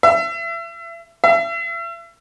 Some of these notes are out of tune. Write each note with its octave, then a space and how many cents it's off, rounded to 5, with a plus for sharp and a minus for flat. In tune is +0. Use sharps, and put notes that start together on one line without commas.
E5 +30
E5 +35